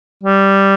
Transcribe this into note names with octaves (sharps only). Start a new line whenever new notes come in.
G3